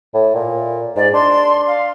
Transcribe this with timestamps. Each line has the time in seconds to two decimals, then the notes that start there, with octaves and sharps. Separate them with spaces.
0.14 A2
0.35 A#2
0.96 G#2 D5
1.13 D4 C6
1.66 F5